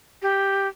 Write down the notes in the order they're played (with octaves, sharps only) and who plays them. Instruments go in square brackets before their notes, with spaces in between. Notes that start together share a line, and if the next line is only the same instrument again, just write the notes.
[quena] G4